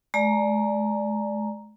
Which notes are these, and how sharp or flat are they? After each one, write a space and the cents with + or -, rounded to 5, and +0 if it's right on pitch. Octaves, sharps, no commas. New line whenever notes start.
G#3 +40 D5 +0 A#5 +0